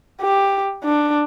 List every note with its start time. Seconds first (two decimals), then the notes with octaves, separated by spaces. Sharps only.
0.22 G4
0.84 D4